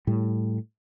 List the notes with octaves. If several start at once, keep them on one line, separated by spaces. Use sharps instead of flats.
A2 G3